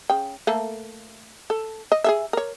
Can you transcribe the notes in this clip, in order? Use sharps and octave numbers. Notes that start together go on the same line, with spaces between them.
C#3 G5
A3 A#3 A4
A4
D#5
G#4 A4 E5
A#4 C#5